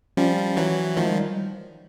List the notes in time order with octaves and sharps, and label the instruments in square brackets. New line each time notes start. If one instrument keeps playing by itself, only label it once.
[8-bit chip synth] F3 G3 [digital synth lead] C#4
[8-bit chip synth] E3 F#3
[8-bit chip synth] D#3 F3 [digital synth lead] A3
[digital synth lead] G#3
G3